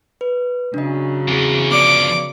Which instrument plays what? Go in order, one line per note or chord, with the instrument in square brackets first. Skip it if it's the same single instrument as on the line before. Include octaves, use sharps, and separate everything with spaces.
[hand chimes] B4
[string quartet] C#3 F#3 [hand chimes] D4 D#5
[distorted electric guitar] E2 [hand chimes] C4 G#4
[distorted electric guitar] D3 F3 [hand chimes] B3 D5 C#7 [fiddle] D6